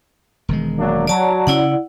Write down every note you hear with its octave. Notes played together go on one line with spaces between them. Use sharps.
E1 D#3 G#3
F#3 A#3 D4
F#3 D5 A5 A#5
C#3 C#4 E4 D5 F#5